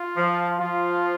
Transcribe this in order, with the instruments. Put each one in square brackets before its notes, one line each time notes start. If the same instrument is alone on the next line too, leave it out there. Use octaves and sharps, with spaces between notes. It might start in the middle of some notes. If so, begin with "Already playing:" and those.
Already playing: [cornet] F4
[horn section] F3
[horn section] F3 [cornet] F4